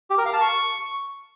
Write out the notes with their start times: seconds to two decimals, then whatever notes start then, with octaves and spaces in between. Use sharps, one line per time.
0.10 G4
0.18 A#4
0.26 F5
0.33 A5
0.41 C#6